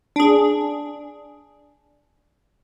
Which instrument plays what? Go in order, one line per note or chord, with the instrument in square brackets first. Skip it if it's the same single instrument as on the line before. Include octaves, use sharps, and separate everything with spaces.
[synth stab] D4 G#4